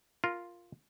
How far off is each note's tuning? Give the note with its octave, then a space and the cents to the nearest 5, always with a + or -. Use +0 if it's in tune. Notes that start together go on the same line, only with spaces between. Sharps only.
F4 +0 A#4 +0